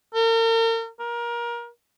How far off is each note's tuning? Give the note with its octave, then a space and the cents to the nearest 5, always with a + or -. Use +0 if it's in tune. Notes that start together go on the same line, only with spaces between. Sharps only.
A#4 -40
A#4 +25